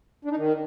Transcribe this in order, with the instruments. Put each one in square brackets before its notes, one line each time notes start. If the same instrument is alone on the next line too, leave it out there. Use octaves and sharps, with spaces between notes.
[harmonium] D4
D#4
D#3